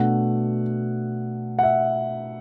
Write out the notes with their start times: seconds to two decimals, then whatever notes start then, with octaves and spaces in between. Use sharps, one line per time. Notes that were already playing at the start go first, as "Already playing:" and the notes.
Already playing: B2 A3 D4 F#5
1.59 F#5
1.63 E5